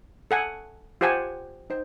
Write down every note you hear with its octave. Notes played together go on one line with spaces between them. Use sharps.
A4 F#5 G#5
F4 G4 C5 F#5 G#5 A5
D#4 C5